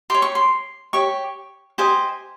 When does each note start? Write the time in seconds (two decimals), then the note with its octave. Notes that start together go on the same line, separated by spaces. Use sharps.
0.10 G4 C#5 C6
0.22 C#6
0.35 C6
0.93 G4 C#5 C#6
1.78 G4 C5 D#5 G#5